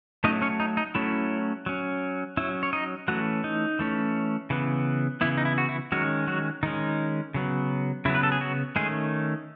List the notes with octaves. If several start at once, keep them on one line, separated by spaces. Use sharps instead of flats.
F#3 A3 C#4 D#4 D#5
C#4 C#5
D#4
D#4
F#3 A3 C#4 E4
F#3 C#4
F#3 C#4 E4
C#5
D#4 D#5
E3 F#3 A3 C#4 F#4
D#4
E3 A3 C#4
C#3 E3 B3
C#3 E3 B3 E4
D#4
E4
F#4
E4
D#3 F#3 G#3 C#4 F#4
F#3 F#4
D#3 G#3 C#4 D#4
C#3 F#3 B3
C#3 F#3 B3 E4
B4
A4
G#4
F#3 F#4
D#3 G#3 A3 C#4 G#4